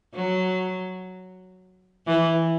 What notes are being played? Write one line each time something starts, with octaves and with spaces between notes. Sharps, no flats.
F#3
E3